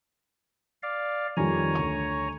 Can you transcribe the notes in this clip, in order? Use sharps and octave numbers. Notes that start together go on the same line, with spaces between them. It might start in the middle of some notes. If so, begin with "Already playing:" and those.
D5 F5
F2 D#3 G3 C#5 G#5 A#5
D2 C#6